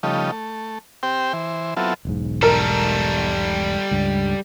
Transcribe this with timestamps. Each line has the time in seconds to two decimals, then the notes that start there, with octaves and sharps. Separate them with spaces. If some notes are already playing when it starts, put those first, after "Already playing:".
0.03 C#3 F3 G3 A3 D#4
0.32 A3
1.03 C4 G4 C5 G5
1.33 E3 C5
1.77 F#3 B3 C4 E4 F4 A4
2.05 E1 B1 G#2
2.43 G3 A4 A#4
3.91 C#2 G2